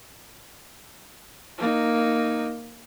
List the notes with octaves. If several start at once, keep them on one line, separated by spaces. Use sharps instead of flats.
A#3 D#4